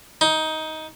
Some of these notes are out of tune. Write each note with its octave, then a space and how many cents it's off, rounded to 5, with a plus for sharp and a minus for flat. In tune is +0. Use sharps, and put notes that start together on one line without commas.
D#4 +15